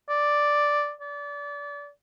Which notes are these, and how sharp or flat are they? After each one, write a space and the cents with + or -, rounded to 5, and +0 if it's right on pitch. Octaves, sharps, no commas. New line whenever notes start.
D5 +0
D5 -30